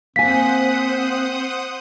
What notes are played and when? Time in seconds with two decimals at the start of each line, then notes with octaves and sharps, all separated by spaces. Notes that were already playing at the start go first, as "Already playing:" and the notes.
0.16 A#3 C4 C5 F#5 G#5 D#6 B6